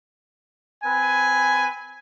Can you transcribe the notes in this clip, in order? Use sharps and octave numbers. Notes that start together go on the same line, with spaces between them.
C4 B4 G#5